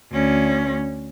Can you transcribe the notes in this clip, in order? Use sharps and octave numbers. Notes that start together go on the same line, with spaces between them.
D2 C#4